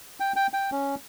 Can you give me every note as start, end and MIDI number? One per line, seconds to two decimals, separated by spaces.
0.20 0.33 79
0.36 0.47 79
0.53 0.70 79
0.72 0.95 61